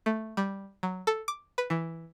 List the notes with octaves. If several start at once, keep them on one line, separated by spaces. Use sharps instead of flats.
A3
G3
F#3
A4
D6
B4
E3